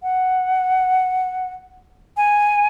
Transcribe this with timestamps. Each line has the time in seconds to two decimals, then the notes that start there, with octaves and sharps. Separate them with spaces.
0.03 F#5
2.17 G#5